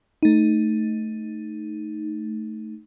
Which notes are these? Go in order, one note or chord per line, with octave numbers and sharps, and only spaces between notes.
A3 D#4